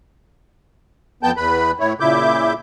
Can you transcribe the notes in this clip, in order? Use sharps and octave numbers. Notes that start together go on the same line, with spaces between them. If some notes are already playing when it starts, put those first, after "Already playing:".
F2 B3 G5 A5 G6
E2 B4 B5
A2 E4 C#5
A#2 C#3 E4 E5 D6 G6